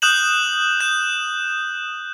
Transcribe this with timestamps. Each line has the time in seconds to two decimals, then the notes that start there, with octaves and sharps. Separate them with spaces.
0.02 D#6 F#6 G6 E7 F#7
0.80 G6 E7